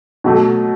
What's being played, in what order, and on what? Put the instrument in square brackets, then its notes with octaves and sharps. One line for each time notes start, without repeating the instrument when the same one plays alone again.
[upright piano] B2 F#3 A3